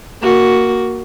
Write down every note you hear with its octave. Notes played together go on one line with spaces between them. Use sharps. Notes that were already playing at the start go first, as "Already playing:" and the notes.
A#3 F#4